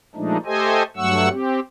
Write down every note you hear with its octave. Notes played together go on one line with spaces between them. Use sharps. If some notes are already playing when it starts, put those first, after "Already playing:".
A#2 F3 G#3 A3 D4 D#4
A3 G4 A4 C5 D#5 G#5
G2 F#3 A3 F#5 C#6 E6
C4 G4